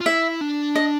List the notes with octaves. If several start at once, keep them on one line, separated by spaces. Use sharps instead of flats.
F4
E4 E5
D4
D#5